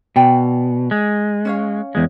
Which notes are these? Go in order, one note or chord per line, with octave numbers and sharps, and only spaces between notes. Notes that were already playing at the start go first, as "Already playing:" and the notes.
B2 D5 G5 G#5
G#3
C#4 C#5 F5
E2 G#3